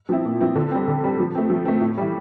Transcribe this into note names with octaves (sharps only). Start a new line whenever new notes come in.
F3 C4 E4
A#2
F3 C4 E4
D3
G3 C4
D3
G3 C4
F3
A3 C4
F3
A3 C4
A2
E3 G3